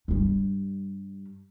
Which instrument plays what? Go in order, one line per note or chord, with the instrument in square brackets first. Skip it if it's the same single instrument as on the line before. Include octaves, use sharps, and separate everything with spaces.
[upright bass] G2 G3